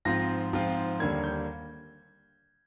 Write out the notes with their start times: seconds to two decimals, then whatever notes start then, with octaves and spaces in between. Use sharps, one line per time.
0.05 G#2 F3 C4 F4 A#6
0.53 G#2 F3 C4 F4
1.00 D#2 D3 G3 A#3 G#6
1.24 G6